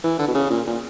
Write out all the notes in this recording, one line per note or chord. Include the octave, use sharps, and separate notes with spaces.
E3
D3
B2
C#3
A#2
A#2